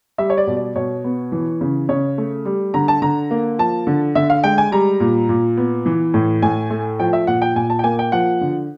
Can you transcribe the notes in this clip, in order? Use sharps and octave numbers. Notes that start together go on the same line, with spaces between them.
G3 E5
C#5
D5
B2
D5
B2 C#5
B3
E3
C#3
C#3 C#5
A3
G3
D3 A#5
A5
D3 A#5
A#3
F3 A5
D3
D3 E5
F5
G#3 G5
G#5
G3 A#5
A#2
A#2
B3
E3
A2
A2 G#5
A3
F3 G5
E5
A#2 F#5
G5
A#2 G#5
A5
G5
A#3 G#5
G5
F3 F#5
D3